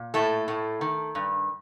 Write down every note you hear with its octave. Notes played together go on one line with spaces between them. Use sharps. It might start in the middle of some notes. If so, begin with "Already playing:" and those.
Already playing: A#2
A2 A3 A4
A2
D#3
G2